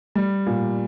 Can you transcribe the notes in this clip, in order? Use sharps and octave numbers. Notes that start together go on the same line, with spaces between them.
G3
A#2